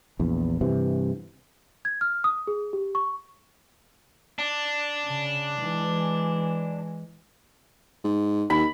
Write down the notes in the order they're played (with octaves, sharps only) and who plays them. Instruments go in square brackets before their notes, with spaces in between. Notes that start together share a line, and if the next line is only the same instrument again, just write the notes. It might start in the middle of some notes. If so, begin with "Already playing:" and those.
[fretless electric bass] A#1 E2
G2 C3 E3
[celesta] G#6
F6
D#6
G#4
G4
C#6
[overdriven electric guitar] D4
[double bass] C#3
E3 G#3
[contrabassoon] G#2
[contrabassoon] D#2 [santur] B5